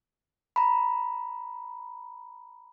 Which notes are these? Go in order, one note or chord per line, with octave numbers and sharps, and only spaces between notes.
A#5 B5